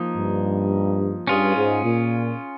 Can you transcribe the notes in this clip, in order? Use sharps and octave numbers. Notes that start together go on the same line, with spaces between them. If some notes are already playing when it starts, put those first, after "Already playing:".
Already playing: F3 A#3 D#4
G2
G2 C#4 F4 G#4
G#2
A#2